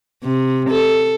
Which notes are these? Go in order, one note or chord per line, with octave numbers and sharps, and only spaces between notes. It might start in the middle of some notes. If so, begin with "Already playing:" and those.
C3
A4